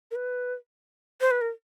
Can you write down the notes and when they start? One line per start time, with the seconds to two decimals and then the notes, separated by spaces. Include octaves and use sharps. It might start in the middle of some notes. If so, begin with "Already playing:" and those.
0.11 A#4
0.16 B4
1.21 C5
1.31 B4
1.41 A#4